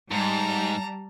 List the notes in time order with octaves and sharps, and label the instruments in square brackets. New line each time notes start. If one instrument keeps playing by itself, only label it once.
[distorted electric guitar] G#2 [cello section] G3 [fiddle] A5 A#5